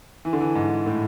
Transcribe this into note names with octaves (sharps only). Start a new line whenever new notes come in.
E3
D3
E3
G#2
A2